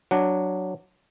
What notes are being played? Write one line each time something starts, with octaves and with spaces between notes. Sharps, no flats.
F#3 D4